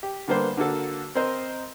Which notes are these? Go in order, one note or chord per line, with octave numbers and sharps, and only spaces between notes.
G4
D3 G3 A#3 B3 C5
D3 A#3 F#4 A4
C4 A#4 C5 D#5